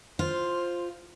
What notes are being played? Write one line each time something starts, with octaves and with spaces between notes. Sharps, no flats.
F4 C5